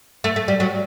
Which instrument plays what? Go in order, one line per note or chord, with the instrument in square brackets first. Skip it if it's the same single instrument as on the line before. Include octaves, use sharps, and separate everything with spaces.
[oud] A3
A3
G3
F#3